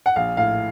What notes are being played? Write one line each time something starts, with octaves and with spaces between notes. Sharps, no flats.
F#5
A#1 F5
A2 F5